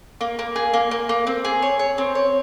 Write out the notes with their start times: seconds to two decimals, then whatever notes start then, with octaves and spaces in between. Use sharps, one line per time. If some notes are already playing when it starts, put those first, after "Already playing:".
0.21 A#3
0.39 A#3
0.56 G#4
0.73 A#3
0.91 A#3
1.09 A#3
1.27 C4
1.45 G#4
1.62 C#5
1.79 C#5
1.98 C4
2.15 C#5